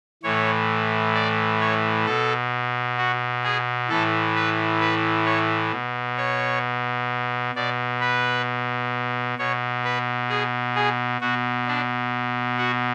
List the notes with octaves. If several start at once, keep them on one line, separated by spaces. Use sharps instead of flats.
A2 E3 C#5
D5
C#5
B2 A4
F#4
G#4
A2 E3 A4
B4
B4
C#5
B2
C#5
B2 D5
B4
B2 C#5
B4
G#4
G#4
B2 F#4
D4
F#4